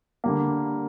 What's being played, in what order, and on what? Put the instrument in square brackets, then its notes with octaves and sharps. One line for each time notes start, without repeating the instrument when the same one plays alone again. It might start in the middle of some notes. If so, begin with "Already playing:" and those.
[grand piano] D3 G3 A#3